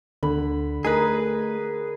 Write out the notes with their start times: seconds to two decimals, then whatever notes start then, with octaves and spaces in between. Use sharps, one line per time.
0.23 D2 D3 B5
0.85 A3 D#4 G#4 A#4 B4